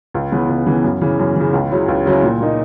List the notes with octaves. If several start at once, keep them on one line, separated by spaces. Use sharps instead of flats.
C#2
C#3 E3 B3
C#2
C#3 E3 B3
F#2
C#3 E3
F#2
C#3 E3
C#2
C#3 F#3 C#4 E4
C#2
C#3 F#3 C#4 E4
A#2
A#3 D#4